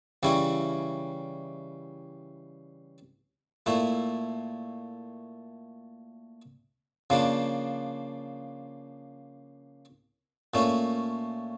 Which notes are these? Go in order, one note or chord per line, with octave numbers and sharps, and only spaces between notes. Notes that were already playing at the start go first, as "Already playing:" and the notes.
C#3 E3 G3 C#4 E4
A#2 A3 E4
C#3 F3 A#3 D4
A#2 A3 C#4